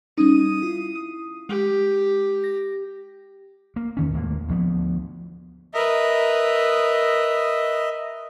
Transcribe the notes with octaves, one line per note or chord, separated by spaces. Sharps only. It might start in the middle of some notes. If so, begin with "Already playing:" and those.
G3 C#4 D#4 D#6
E4 F4
G#3 G4
A#6
A#3
E2 D#3 C#4
D#2 A2 G#3 A#3
D2 F3 B3
A#4 B4 D#5 E5